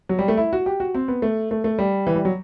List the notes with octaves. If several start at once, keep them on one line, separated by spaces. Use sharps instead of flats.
F#3
G3
A3
E4
F#4
G4
F#4
C4
B3
A3
A3
A3
G3
E3
G3
F#3